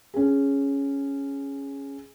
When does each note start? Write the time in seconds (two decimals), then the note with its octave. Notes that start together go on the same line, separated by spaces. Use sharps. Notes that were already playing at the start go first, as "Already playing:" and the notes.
0.14 C#4 G#4